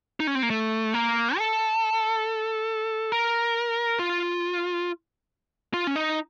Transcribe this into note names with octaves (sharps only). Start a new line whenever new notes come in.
D#4
C#4
C4
A#3
A3
A#3
A4
A#4
F4
F4
C#4
D#4